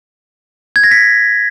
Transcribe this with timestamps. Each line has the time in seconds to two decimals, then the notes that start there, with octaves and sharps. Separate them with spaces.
0.76 G#6
0.84 A#6
0.91 B6